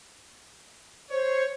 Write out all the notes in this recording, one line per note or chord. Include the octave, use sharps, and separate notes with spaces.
C5 C#5